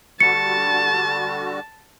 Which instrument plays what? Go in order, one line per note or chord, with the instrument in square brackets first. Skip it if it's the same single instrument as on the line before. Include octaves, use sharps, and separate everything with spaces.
[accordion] D3 G3 F#4 [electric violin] A5 [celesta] C#7